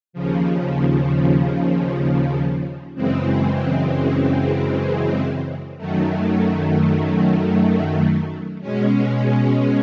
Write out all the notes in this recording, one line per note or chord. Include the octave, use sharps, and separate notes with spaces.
D#2 C#3 F3
F#2 C#3 E3 G#3 C4
F#2 D#3 F#3 A3
B2 G#3 C#4